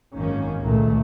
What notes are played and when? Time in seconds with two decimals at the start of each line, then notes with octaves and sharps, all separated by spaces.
0.16 G#1 F#2 D#3 A#3 C#4
0.62 C#2 A#2 D#3 A3